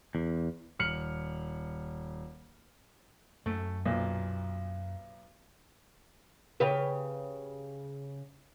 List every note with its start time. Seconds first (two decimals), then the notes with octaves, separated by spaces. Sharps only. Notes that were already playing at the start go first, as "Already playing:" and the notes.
0.15 E2
0.79 D#1 F6 C#7 F#7
3.46 F#2 A3
3.86 B1 A#2
6.60 C#3 G4 B4